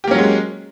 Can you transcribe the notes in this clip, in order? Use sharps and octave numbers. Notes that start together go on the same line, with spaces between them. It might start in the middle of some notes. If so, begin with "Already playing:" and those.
F#3 G#3 A#3 C#4 G4